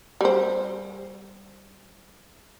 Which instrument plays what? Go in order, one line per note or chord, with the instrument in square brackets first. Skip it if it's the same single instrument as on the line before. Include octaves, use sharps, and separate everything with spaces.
[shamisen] G3 C5